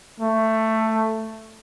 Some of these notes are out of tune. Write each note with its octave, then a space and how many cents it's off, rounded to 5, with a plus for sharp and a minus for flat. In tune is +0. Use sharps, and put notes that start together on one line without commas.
A3 +10